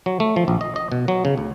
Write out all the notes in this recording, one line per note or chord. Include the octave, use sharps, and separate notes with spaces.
F#3
A3
F3
A#1
D#5
D#5
B2
F#3
C#3
D2